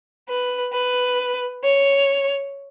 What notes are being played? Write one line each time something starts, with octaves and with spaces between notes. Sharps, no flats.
B4
B4
C#5